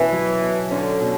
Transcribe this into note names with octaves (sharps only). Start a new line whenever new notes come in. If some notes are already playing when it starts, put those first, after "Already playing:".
Already playing: B2 E3 C#4
F#3
B2
D3 C#4
B2